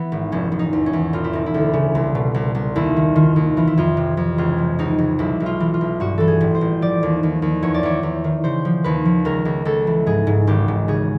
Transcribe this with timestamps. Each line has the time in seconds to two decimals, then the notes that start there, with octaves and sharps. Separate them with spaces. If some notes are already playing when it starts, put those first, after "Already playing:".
Already playing: E3 B3
0.12 G#1
0.32 F1 C#4
0.52 F1
0.59 D#4
0.73 E2
0.86 C#4
0.93 E2
1.13 E1 F4
1.24 E4
1.33 E1 D#4
1.46 E4
1.54 D2
1.74 C#3
1.95 C2
2.15 B2
2.34 C2
2.55 C2
2.76 D#2 E4
2.97 D#3
3.16 D#3 F4
3.36 D#2
3.57 E3 F4
3.67 E4
3.77 F2 F4
3.97 C3
4.17 F2
4.38 C#2 F4
4.58 F3
4.79 C#2 D#4
4.98 C#2
5.19 B1 E4
5.40 B1
5.46 F4
5.60 E3
5.74 F4
5.81 B1
6.00 G2 F#4
6.18 E3 A4
6.28 G#4
6.41 A1
6.55 C5
6.61 A1
6.82 F3 D5
7.03 D#2
7.23 D#2
7.42 D#2
7.62 E2 C#5
7.74 D5
7.83 E2 C#5
8.03 E2
8.24 D#3
8.44 C#3 C5
8.65 F3
8.84 D#2 B4
9.05 F3
9.25 C#2 A#4
9.45 C#2
9.65 C#2 A4
9.87 E3
10.06 G#2 G#4
10.27 G#2
10.47 G#1 G4
10.68 G#2
10.88 C#3 G#4